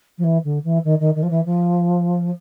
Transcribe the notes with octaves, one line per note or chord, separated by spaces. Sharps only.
F3
E3
D3
E3
D#3
D#3
D#3
F3
E3
F3